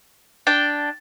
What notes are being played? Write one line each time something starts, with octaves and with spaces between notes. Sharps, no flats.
D4 G5 A6